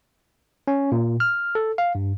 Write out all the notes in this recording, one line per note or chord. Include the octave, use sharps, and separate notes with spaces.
C#4
A#2
F6
A4
F5
G2